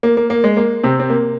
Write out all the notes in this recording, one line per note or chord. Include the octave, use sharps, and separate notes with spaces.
A#3
A#3
A#3
G#3
A#3
C3 C4
C4
A#3